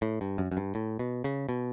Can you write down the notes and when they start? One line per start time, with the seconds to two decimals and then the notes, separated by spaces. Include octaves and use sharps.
0.02 A2
0.21 G2
0.38 F#2
0.51 F#2
0.57 G2
0.75 A2
0.99 B2
1.24 C#3
1.49 B2